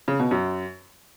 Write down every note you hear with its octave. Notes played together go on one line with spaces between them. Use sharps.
C#3
B2
F#2